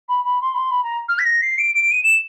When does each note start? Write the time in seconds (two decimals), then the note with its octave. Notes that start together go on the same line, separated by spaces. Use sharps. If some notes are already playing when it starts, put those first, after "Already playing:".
0.08 B5
0.25 B5
0.41 C6
0.54 B5
0.58 C6
0.71 B5
0.83 A#5
1.09 F6
1.19 B6
1.25 A#6
1.42 C7
1.58 D7
1.75 D7
1.91 D#7
2.04 E7